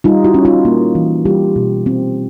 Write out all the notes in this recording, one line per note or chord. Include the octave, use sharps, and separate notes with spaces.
G3 D#4 F4
E4 F#4
C#4
D#4 F4
A#3
E3
G3 F4 G4
B2
C4